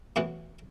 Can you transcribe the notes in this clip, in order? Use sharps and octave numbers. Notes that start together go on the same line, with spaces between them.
A2 E3 B3 F#4